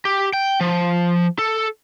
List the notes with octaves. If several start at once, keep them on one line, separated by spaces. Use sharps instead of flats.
G4
G5
F3
A4